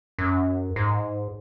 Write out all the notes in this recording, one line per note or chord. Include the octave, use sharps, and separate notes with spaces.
F#2
G#2